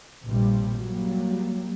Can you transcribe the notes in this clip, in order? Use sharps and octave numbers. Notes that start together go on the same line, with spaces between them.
A#1 G2 C3 G3
F#3 G3 A#3